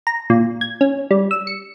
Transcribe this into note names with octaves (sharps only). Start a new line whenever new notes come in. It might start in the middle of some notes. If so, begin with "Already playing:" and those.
A#5
A#2
G#6
C#4
G3
E6
C#7